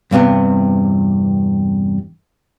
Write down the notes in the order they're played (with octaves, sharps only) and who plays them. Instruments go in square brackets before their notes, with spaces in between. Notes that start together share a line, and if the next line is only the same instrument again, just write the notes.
[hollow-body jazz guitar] E2 G2 C3 B3